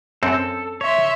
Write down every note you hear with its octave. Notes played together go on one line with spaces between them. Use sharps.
F#2 C4 A4
C#5 E5 C6